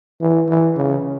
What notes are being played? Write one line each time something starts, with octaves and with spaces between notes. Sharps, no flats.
E3
E3
C#3